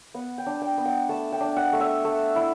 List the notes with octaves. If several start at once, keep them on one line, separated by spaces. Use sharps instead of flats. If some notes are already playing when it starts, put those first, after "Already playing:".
B3 F#5
G5
D4
G5
B3
F#5
A3 A5
G5
D4
F#5
A3
E5
A3
E4